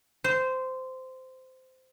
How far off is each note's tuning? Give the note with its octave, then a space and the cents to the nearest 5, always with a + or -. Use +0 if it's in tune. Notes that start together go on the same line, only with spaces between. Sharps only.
C5 -15